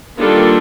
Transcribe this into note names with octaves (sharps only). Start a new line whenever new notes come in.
D#3 G3 A#3 D4 F4 A4